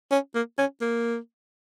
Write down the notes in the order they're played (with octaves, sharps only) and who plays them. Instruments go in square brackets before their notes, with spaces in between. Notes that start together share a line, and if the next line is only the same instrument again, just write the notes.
[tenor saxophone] C#4
A#3
C#4
A#3